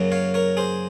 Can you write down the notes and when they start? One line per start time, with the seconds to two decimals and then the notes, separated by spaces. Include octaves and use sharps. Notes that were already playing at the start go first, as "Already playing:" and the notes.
Already playing: F#2 C#3 F#3 A#3
0.12 C#5 F5
0.34 A#4 C#5
0.57 G#4 C5